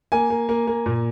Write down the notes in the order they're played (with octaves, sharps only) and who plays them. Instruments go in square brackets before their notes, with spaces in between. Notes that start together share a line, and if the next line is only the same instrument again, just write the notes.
[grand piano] A#3 G#5
A#3
A#3
A#3
A#2